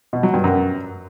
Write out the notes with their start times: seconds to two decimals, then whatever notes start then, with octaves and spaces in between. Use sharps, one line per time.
0.13 B2
0.23 F#3
0.34 G2
0.44 F#2